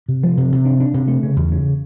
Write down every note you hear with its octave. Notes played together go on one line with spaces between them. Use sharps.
C3
F3
C3
C3
D4
D4
C3
A3
C#3
E2
C#3